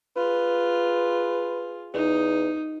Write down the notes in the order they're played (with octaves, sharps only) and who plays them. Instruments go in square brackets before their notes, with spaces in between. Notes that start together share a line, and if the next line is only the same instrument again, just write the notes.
[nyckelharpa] F4 G#4 [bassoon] B4
[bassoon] E2 [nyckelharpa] D#4